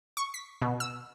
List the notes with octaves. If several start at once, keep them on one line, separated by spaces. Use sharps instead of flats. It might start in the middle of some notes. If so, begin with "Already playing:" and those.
C#6
B6
B2
E6